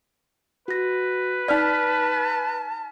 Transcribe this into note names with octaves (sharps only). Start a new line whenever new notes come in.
F#4 B4 A#6
D#4 D5 A5 F6 B6